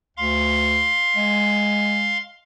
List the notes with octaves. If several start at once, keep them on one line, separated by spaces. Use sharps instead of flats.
D2 F5 C6
G#3